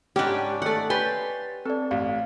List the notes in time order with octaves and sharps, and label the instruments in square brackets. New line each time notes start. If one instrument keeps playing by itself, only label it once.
[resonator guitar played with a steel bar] G#2 G4 [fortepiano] G3 F#5 [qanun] C#4 D4
[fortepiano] D#3 A3 [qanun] D5 F#5
[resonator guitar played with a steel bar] G4 B4 [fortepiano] C#5 [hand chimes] G#5 A6 [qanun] C6
[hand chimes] C4 D5 [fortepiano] A4
[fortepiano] A1 [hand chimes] F5